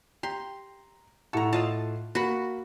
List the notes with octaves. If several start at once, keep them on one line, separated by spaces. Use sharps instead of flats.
G4 A#5 C6
A2 A4 F#5 A#5 C#6
F4 A4 D#5 F5 A5
A#3 F#4 B4 B5